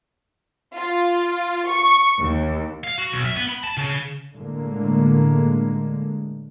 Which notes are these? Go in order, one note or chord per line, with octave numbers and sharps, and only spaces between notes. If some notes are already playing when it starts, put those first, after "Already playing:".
F4
C#6
D#2
F5
F#4
B1
E5
B3
B5
A5
C#3
A2 D3 G#3 A#3